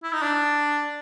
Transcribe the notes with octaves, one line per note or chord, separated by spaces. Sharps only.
E4
D#4
D4